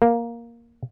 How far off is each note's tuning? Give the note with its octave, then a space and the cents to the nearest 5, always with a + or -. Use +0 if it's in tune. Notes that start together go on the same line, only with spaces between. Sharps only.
A#3 +5